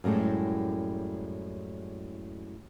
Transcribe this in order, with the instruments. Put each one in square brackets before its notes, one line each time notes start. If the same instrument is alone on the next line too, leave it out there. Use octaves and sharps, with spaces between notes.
[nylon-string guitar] F#2 A2 G3 G#3